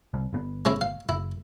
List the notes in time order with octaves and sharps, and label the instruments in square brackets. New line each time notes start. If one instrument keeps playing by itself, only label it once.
[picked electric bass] C2
G1 C#3 B3
[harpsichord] G#3 C#4 E4
F5
[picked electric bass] F#1 [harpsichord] E4